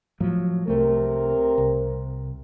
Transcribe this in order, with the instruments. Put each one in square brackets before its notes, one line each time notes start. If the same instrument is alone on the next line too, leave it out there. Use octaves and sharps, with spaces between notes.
[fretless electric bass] A2 F3 F#3
[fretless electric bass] C2 A3 [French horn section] C3 C4 A#4
[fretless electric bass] C2